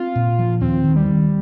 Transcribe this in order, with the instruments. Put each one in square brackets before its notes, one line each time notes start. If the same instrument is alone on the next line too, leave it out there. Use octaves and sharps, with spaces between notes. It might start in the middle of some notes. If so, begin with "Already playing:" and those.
Already playing: [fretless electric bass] C4 [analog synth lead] F4
[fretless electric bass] A#2
F3
[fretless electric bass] D#2 [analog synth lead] C4
[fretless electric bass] D#3
[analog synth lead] G3
[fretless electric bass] D#3